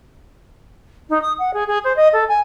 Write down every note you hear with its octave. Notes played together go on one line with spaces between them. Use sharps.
D#4
D#6
F#5
G#4
G#4
C5
D#5
A4
G#5